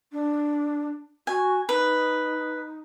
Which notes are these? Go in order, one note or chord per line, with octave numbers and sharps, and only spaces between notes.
D4
F#4 G#5
D#4 B4